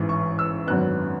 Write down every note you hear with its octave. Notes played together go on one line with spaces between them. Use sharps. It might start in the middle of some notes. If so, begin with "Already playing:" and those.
Already playing: A1 G#2 E3
C#6
E6
G#1 F#2 D3 F#3 B3 F#6